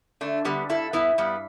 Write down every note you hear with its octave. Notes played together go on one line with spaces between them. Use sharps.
D3 A3 D4
D3 G3 B3
G2 E4 A4
G2 B3 E4
G2 G3 B3